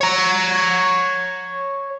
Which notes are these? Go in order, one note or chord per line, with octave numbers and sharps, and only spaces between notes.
C#5 A#5